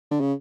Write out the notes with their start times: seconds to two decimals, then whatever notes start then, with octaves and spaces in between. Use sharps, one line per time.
0.11 D3
0.20 C#3